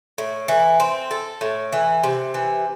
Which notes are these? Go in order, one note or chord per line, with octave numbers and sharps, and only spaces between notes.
A2
E3
C4
A4
A2
E3
C3
E3